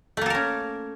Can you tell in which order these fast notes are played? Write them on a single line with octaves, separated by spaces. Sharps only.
A3 A#3 A4 A#4 C#4